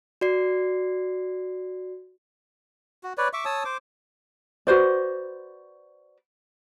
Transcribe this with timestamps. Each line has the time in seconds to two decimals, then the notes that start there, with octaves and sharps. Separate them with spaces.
0.21 F#4 D5 C7
3.03 F#4
3.18 B4 C#5 D5
3.33 E5 C#6 D6
3.45 C#5 A5 D#6 E6
3.65 C5 D6
4.67 F#4 B4 C5 D5